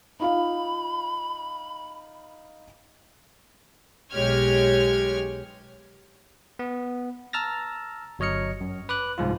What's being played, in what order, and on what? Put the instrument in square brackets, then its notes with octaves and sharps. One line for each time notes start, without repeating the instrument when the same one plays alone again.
[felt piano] D#4 F4 F5 [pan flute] B5
[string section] B1 G#3 G4 C#5 F6 G#6
[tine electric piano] B3
A5 A#5 E6 F6 A6 A#6
G1 F#3 C#5 D#5 F6 C#7
F#2
B4 D6 F#6
C2 G#2 F3 F4